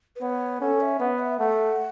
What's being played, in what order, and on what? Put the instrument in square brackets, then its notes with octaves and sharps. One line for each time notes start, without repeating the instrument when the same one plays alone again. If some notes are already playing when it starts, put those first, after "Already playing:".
[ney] B4
[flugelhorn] B3 [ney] C#5
[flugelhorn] C#4 [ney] A4
[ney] E5
[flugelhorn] B3 [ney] C#5
[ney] E5
[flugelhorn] A3 [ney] F#5